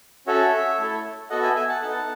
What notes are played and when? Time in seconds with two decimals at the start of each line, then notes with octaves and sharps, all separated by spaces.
0.27 C#4 F#4 A4 C#5 E5
0.79 A3 E4 A4
1.30 B3 F#4 A4 D#5 F#5
1.43 E5 G#5
1.56 E5 G#5
1.69 F#5 A5
1.81 B3 D#4 A4 F#5 A5